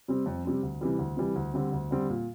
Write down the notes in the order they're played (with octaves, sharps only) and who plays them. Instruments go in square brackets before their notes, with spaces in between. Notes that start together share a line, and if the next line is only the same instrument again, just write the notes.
[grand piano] C3 G3 C4
F2
C3 G3 C4
D2
C3 E3 G3
D2
C3 E3 G3
D2
D3 G3 C4
D2
D3 G3 C4
A#2